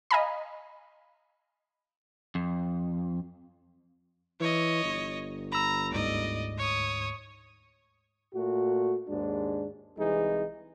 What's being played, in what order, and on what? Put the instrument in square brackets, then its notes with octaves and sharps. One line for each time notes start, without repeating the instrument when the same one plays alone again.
[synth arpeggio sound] D#5 F5 G#5 A#5 B5
[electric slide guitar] F2
[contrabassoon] E3 [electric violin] C#5 D#5
[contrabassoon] G1
[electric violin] A#5 [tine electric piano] B5 E6
[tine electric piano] D2 G#2 [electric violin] D5 D#5
[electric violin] C#5 D#6
[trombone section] A#2 A3 F#4
D#2 G#2 G#3 D4
C2 E3 G#3 D#4 G#4